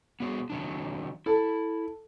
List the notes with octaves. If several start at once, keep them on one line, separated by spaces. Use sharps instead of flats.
B3 F#4 G#4
D#3 F#3 D4
E4 A4